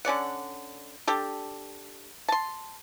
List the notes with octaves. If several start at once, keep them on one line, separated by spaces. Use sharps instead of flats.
D3 C#4 D5 F#5
D4 G4 A4
A5 C6